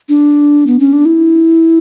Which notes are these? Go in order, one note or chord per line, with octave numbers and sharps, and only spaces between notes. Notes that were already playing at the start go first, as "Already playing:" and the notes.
D4
B3
C#4
D4
E4